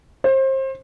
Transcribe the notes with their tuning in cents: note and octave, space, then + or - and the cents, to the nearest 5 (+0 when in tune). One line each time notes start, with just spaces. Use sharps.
C5 +30